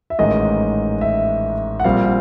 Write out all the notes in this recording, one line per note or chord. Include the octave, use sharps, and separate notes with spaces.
E5
A1 G#2 D#3 G#3 D#5
E5
F#5
A#1 A#2 G3 C4 F5